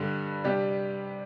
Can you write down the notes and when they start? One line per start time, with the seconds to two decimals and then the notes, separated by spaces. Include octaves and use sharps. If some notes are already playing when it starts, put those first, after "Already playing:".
Already playing: G2 D3 G3
0.44 C3 G3 D4 G4